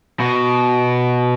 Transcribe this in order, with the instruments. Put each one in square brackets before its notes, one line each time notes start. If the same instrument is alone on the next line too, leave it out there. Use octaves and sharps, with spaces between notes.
[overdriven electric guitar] B2